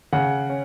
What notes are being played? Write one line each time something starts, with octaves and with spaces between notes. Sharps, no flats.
C#3 F#5
C#4